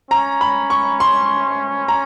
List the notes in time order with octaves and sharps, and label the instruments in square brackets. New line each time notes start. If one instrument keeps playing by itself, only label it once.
[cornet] C#4 [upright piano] A#5
[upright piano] B5
C#6
C6
A#5